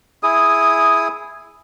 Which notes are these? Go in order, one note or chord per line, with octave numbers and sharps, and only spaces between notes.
E4 G#4 D#6